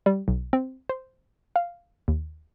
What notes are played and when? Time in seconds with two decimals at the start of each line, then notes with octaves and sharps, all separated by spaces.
0.06 G3
0.28 B1
0.53 C4
0.89 C5
1.56 F5
2.08 D#2